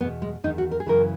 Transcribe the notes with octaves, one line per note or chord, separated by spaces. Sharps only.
E2 B2 B3
G#3
E2 D#3 D#4
F#4
A#4
G#4
F#2 C#3 E3 A#4